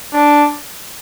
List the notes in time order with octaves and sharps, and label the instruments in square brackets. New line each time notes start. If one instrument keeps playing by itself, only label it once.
[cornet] D4